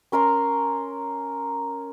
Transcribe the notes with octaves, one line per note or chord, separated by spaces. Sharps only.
C#4 A#4 A#5 C6